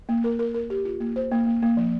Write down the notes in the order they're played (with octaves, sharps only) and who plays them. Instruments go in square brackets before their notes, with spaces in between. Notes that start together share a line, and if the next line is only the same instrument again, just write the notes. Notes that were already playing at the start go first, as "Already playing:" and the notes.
[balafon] A#3
A#4
A#4
A#4
G4
F4
A#3
C5
A#3
A#3
A#3
F3